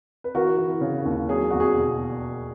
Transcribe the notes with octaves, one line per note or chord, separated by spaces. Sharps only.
B4
E3 F#4 A#4
E3
C#3
D#2
F#3 G#4
E2 F#4
G#4
B2